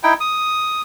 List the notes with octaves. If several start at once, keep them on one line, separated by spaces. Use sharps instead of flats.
D#4 E4 G5
D#6